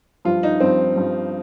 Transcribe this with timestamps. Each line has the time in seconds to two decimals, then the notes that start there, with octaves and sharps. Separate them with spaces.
0.25 G2 F3 F4
0.43 D#4
0.60 G2 F3 C4
0.96 G2 F3